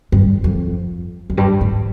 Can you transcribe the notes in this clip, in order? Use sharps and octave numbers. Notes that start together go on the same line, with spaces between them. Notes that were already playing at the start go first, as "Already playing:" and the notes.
G2
F2
F2
G2
G#2